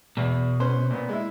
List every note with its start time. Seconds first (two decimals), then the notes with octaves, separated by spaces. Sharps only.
0.17 E2 B2
0.60 C#4 B4 C5
0.90 A#2 B3
1.09 G#3 E4